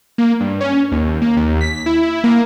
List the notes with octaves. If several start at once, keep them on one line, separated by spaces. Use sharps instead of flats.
A#3
G2
C#4
D#2
A#3
D#2
B6
E4
A#3